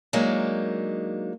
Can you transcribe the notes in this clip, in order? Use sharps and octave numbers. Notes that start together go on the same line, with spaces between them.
F#3 G#3 A#3 D4 D#4